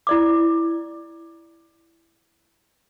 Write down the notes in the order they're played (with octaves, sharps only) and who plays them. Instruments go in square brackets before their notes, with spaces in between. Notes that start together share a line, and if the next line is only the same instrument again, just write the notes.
[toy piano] E4 D5 D6